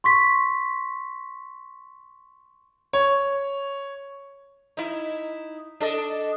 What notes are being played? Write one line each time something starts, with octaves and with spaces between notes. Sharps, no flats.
C6 C#6 B6
C#5
D#4 E4
D4 A4 D#5